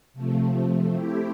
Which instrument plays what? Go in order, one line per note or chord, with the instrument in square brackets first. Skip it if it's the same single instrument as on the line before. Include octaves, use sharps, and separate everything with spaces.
[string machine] C3 F3 A3
A3 C4 E4 G4